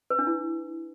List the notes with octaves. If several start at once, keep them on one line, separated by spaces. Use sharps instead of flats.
B4
D4
E4